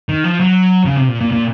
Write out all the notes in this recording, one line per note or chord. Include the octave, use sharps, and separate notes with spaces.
D#3
F3
F#3
C#3
C3
A#2
A#2
A#2